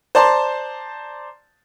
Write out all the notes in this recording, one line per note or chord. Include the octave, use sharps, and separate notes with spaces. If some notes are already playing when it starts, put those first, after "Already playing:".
C5 D5 A5 A#5 C6